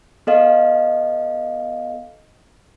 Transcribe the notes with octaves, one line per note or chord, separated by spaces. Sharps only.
B3 A4 D#5 F5